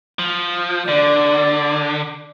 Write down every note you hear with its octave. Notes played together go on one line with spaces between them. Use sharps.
F3
D3 D5